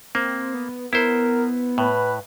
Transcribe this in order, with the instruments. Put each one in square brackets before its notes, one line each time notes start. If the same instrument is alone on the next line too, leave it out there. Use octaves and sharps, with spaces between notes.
[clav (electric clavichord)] A#3 [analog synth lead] C4
[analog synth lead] B3
[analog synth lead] B3 [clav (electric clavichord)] E4 C5 [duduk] A#4
[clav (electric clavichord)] A2 [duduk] B4